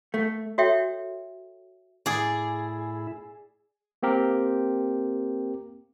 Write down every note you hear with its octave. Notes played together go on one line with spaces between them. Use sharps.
A3
F#4 A4 C#5 E5 G5
A2 E4 G#4 D5
A#3 C4 G4 A#4